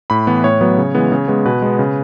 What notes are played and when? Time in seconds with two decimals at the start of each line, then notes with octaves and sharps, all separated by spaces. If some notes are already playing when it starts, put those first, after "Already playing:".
0.10 A2 B5
0.27 E3 B3
0.44 A2 C#5
0.61 F#3 B3
0.77 C#3
0.95 E3 G#3 B3
1.12 C#3
1.28 G#3 B3
1.45 B2 B4
1.62 G#3 B3
1.79 C#3